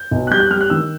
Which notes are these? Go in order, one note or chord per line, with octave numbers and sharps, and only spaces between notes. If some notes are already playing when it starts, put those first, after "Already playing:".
Already playing: G6
B1
F#6
G3 G6
F#6
G3 F6
F#6
D#3 E6